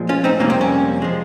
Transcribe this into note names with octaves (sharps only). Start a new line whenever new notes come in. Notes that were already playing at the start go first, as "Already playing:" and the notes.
Already playing: A#2 F3 G#3
C#4 F4
C4 D#4
F2 C3 G3 A#3 C#4
C4
C#4
F3 G#3